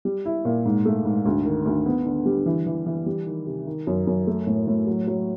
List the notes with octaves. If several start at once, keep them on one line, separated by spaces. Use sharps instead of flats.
G3
E4
A#2
G#2
A3
G#2
D2
D#3
D2
B3
D3
G3
E3
E3
E3
G3
D#3
C3
D#3
F#2
F#2
A3
A2
A2
F#3
F#3